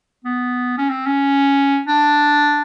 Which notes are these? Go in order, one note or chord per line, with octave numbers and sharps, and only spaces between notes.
B3
C#4
C4
C#4
D4